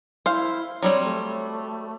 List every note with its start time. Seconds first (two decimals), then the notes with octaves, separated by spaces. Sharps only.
0.26 E4 C5 F5
0.83 F#3 G3 C4 C#5
1.04 A3